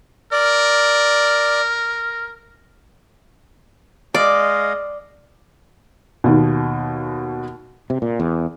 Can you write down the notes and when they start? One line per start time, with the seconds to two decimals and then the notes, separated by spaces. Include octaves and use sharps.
0.32 A#4 D5
4.14 G#3 D5 D#5 F5
6.24 D#2 B2
7.90 C3
8.02 A#2
8.20 E2